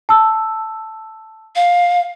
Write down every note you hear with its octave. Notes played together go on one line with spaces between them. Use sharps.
A5 E6
F5